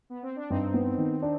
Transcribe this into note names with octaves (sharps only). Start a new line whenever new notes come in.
B3
C4
D4
G2 C4 D#4
B3
D#3
D4